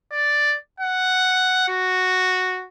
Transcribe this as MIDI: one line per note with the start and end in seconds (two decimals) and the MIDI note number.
0.12 0.55 74
0.80 1.68 78
1.68 2.66 66